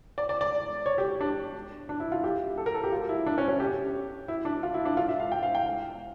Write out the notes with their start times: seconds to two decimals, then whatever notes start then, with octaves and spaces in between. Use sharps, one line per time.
0.18 D5
0.29 D5
0.41 D5
0.86 C#5
0.98 G4
1.21 D4
1.89 D4
2.00 E4
2.12 F4
2.24 G4
2.58 A4
2.66 A#4
2.74 A4
2.84 G4
2.92 F4
3.09 E4
3.26 D4
3.38 C#4
3.48 C#4
3.60 G4
4.28 E4
4.45 D4
4.63 F4
4.74 E4
4.85 D4
4.97 F4
5.08 E5
5.20 F5
5.32 G5
5.43 F5
5.55 G5
5.66 F5